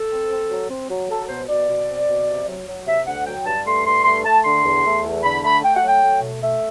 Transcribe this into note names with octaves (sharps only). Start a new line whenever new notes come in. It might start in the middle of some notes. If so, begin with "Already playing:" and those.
Already playing: A4
C4
C4
F#3
C4
F#3
F#3 A4
B2 C5
B2 D5
B2
C4
B2
C3
F#3
F#3
C3 E5
D2 F#5
F#3 G5
G2 A5
A3 C6
G2 C6
A3 C6
A3 A5
D3 C6
E2
A3
E2
D3 B5
A3 B5
A3 G5
F#5
F#3 G5
A3
B2
A3 E5